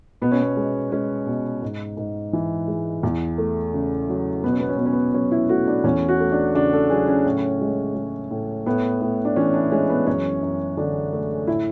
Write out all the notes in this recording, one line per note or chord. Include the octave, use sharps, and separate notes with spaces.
B2 B3
C#4
B3
G#3
G#3 C#4
B2
G#2
G#2
E3
G#3
E2
A3
C#3
F#3
B2 B3
C#4
B3
C#4
B2 B3
C#4
B3
F#3 C#4
E4
A3 F#4
D4
E2 C#4
F#4
A3
D4
C#3 D4
A4
F#3 G#4
C#4
A2
G#3
G#3
A2
A2 B3
A2
D4
E3 C#4
D4
G#3 C#4
B3
F#2 C#4
F#2
D3 D4
A3
A2 E4